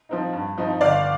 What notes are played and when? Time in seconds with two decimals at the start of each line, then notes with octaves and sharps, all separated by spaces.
0.09 F3 C4 D#4
0.33 G2
0.58 F3 C4 D#4
0.81 G1 D5 F5